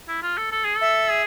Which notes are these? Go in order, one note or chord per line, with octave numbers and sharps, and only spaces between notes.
E4
F4
A4
A4
G#4
A4 E5
G#4